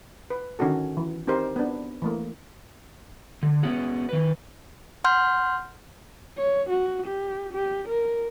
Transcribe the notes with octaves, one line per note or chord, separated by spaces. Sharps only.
B4
D3 D#3 C#4 D#4 F#4 A4
E3
C4 D#4 G4 A#4 C5
B3 D4
E3 A3 A#3
D3
B3 C#4 F#4 G#4
D#3 B4
F#5 C6 F6 G6
C#5
F#4
G4
G4
A#4